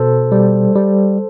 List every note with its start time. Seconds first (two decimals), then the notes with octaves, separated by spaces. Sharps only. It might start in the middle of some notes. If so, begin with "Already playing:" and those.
Already playing: B2 A4 C5
0.32 G3
0.75 G3